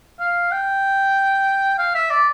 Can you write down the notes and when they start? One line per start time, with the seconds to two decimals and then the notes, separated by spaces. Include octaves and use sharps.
0.20 F5
0.52 G5
1.78 F5
1.95 E5
2.10 D5